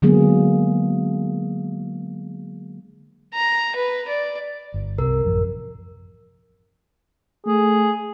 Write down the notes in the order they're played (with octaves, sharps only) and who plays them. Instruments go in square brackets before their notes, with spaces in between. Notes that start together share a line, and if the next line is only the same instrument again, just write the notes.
[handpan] D3 F#3 G#3 A#3 B3 G#4
[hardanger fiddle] A#5
B4
D5
[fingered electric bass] G1
[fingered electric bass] C2 C3 [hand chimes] A#4
[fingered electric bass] A1 F#2 F3
[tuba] A3 [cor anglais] G#4